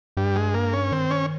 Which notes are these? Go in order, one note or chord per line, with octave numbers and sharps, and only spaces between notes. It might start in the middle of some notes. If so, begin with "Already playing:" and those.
G2 G3
G#3
A#3
C#4
D#3 C4
C#4